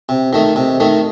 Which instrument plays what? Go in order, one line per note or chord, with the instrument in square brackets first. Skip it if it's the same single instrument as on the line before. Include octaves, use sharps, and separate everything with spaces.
[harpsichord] C3
D#3 A3 D#4
C3
D#3 A3 D#4